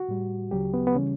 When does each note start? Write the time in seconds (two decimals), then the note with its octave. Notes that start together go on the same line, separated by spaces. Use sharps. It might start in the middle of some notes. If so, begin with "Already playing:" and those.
Already playing: F#4
0.08 A2 G3
0.51 D2 C#3 F#3 G4
0.74 B3
0.87 B3
0.95 C#3 E3 G3 C#4